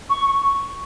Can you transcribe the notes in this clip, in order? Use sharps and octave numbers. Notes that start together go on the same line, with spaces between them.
C#6